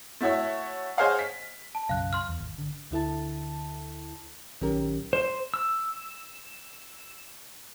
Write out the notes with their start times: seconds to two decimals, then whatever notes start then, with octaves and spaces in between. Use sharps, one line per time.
0.21 A3 E4 F#4 C#5 E5
0.98 G#4 C5 C#5 D#5 F5 F#5
1.19 B6
1.75 A5
1.89 B1 F#2 C#3 F5 F#6
2.13 C6 F6
2.29 E2
2.41 G#1
2.58 D3
2.91 D2 D3 E4 A4 A5
4.61 A#1 D#3 F#3 C#4 G4 A#4
5.13 C5
5.54 E6